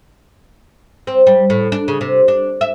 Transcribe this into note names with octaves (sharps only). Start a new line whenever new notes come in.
C4
G3
A2
D4
C#3
C3
D4
E5